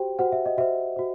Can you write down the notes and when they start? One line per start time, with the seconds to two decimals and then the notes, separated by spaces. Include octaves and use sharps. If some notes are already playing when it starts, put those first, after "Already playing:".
Already playing: F#4 G4 C5 G5
0.19 F#4 C5 F#5
0.32 E5
0.46 D#5
0.57 F#4 C5 E5
0.96 F#4 C5